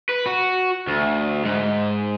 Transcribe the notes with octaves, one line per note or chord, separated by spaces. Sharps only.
B4
F#4
D2
G#2